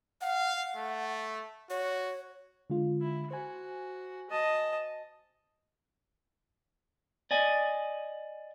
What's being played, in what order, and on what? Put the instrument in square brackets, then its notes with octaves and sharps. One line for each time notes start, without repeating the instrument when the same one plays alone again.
[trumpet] F5 [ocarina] F#5
[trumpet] A3
[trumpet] F#4 [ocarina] C#5
[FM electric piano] D3 G#3 F4
[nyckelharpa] E4
[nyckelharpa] F#4 [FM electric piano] C5 G#5
[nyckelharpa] D#5 A5
[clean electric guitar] D5 D#5 G#5